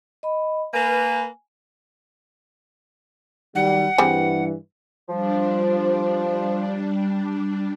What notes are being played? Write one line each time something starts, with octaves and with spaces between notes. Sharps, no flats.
D#5 B5
A#3 B4 G#5
D#3 F#3 G3 F#5
G2 E3 G3 C4 G#4
F3 G3 D4